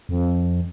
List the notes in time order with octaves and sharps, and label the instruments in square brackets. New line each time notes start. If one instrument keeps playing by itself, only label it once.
[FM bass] F2